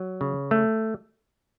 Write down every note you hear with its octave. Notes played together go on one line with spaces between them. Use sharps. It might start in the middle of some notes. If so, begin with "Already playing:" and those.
Already playing: F#3
C#3
A3